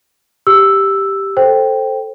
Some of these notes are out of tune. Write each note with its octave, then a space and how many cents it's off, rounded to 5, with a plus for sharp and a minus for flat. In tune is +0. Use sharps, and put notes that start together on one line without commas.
G4 +0 E6 +5
A4 +0 C5 +10 G5 +0